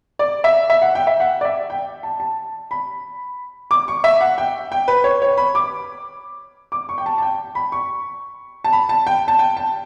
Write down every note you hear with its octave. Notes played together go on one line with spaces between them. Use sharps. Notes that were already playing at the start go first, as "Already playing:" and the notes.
D5
E5
E5
F#5
G5
E5
F#5
D5
E5
G5
A5
A5
B5
D6
C#6
E5
F#5
G5
G5
B4
C#5
C#5
B5
D6
D6
C#6
G5
A5
A5
G5
B5
C#6
A5
B5
A5
G5
A5
G5
A5